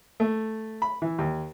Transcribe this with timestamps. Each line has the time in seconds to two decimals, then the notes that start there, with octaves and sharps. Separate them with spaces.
0.20 A3
0.82 B5
1.02 E3
1.18 D#2